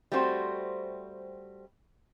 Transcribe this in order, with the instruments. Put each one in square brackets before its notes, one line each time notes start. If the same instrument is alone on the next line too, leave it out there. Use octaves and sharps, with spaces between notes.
[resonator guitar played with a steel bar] G3 A3 C4 F#4 G#4 C5